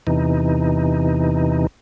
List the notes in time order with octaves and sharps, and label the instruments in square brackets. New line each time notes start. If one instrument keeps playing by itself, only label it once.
[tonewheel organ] E2 C3 E3 D#4